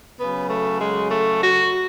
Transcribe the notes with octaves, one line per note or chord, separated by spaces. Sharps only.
C#3 F#3 B3
A3
G#3
A3
F#4